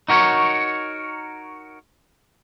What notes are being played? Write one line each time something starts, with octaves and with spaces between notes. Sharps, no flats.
D#4 F#4 A#4 C#5